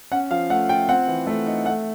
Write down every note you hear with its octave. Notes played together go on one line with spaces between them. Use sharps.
C#4 F#5
F3 F5
A3 F#5
F4 G5
C4 F#5
E3
A3
D#4
A3 F#5